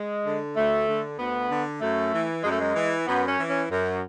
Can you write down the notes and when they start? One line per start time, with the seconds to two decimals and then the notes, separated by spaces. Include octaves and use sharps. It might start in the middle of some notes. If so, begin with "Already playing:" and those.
Already playing: G#3
0.24 D3
0.56 D2 A3
0.87 D3
1.19 D2 B3
1.50 D3
1.81 F#2 A3
2.13 E3
2.43 F#2 G#3
2.51 A3
2.59 G#3
2.75 E3
3.07 F#2 B3
3.27 C#4
3.38 E3
3.48 C#4
3.70 F#2